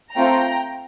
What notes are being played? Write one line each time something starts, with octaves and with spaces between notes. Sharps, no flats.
A3 C4 F4 A4 G5 A#5